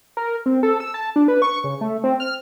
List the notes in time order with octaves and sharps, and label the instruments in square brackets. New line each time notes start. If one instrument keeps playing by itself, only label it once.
[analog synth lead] A#4
C4
A4
E6
A5
D4
B4
C#6
C#3
A3
C4
F6